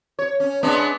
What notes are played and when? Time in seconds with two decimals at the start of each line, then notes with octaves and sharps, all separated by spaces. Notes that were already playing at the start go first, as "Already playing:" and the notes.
0.19 C#5
0.40 C#4
0.63 G#3 B3 D4